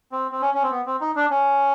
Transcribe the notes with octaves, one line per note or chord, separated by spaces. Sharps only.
C4
C4
C#4
C#4
C4
B3
C4
D#4
D4
C#4